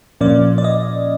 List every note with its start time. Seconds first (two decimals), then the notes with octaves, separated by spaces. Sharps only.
0.21 A#2 F3 A#3 C#4 D5
0.58 D5
0.64 D#5